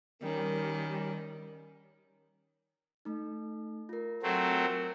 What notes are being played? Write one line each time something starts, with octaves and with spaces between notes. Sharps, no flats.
D#3 G3 C#4 A#4
A3 D#4
F4 A#4
F#3 A3 C4
A#4